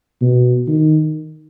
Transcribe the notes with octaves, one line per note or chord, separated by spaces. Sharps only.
B2
D#3